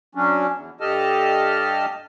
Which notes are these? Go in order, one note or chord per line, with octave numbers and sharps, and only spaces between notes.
F#3 C#4 D4
E2
G2 G4 A4 D#5 A5 F6